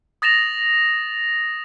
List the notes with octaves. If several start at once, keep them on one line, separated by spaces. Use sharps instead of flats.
D#6 A6 A#6 E7 F7